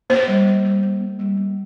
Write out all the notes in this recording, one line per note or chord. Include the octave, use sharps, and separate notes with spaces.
A#3 C5
G3
A#3
G3
A#3
A#3
G3
A#3